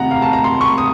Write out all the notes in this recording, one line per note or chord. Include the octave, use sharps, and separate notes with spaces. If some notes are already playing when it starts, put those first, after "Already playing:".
Already playing: C3 D#3 F#5 A#5
F5
A5
A#5
C6
C#6
D#6